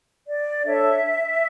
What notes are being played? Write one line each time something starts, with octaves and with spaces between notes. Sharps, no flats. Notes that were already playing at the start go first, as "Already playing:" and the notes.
D5
D4 A4 C#5 E5